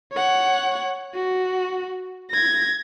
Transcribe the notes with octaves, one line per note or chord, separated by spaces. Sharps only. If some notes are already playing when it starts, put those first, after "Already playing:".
C#5 F#5
F#4
G#6 A#6